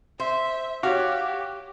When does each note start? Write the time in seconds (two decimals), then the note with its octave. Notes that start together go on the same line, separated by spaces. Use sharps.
0.20 C5 E5
0.83 F#4 G4 C#5 F5